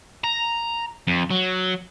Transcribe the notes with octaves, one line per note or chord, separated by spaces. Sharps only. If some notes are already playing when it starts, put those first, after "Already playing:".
A#5
F2
F#3